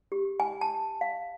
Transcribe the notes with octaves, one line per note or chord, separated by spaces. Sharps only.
G4
G#5
A5
F5